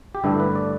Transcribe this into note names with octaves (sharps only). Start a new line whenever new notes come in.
G4
G2 D3 A3 D4 E4
B4
D5